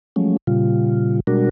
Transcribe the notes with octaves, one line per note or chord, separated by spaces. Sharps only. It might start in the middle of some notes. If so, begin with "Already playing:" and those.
F3 F#3 G#3 A3 C#4
A#2 C#3 G3 F4
B2 G3 G#3 D4 F#4 A#4